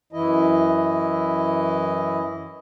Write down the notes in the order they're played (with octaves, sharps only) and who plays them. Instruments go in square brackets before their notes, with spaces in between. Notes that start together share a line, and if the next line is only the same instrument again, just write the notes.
[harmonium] F#2 E3 E4 D#5